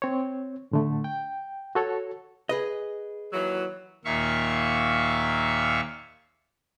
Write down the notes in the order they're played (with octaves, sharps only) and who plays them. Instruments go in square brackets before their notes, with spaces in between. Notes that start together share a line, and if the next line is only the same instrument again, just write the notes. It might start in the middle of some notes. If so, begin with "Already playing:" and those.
[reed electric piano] C4 C#5
A2 D3 A3
G5
F#4 A4 C#5
[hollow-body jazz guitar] G#4 B4 D#5
[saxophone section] D#2 E3 F#3
[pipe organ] D#2 A#2 E5 F5 C#6